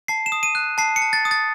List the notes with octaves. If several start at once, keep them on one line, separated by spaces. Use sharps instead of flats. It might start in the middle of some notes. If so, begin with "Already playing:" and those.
A5 C7
E7
D#6
D#7
F#6
A5 C7
C#7
A5
A6
D#6
A6